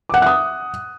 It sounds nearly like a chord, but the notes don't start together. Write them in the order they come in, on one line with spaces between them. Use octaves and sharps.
D6 F#5 E5 F#6 D#6